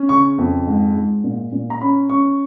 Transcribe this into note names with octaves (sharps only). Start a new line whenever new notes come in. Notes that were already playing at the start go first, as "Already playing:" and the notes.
Already playing: C#4
C#3 C#6
F2
G#2
G#2
A#2
A#2
A#5
C#4 B5
C#4 C#6